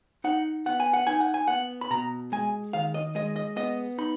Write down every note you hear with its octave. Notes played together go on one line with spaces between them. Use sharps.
D#4 F#5
B3 F#5
G#5
F#5
D#4 G#5
F#5
G#5
B3 F#5
B5
B2 A#5
G#3 G#5
D#3 F5
D#5
G#3 D#5
D#5
B3 D#5
D#4 B5